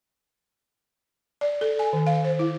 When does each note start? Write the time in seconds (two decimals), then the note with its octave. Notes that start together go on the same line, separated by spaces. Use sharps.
1.41 D5
1.61 A4
1.79 G#5
1.93 D#3
2.07 F5
2.25 C5
2.39 E4